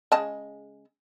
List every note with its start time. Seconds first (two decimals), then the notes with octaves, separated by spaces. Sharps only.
0.12 C#3 G#3 A5